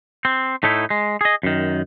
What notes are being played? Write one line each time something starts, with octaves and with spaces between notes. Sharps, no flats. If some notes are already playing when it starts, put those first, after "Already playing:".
C4
A2 A3 D#4 E4
G#3
G#4 D#5
F#2 D#3